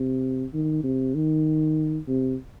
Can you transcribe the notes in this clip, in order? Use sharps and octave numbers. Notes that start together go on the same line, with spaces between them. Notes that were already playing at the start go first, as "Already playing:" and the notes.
Already playing: C3
D#3
C3
D#3
C3